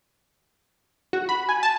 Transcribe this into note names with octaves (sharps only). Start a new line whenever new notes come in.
F#4
B5
G#5
A5